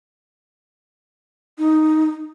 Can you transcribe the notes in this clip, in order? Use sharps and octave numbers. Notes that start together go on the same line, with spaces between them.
D#4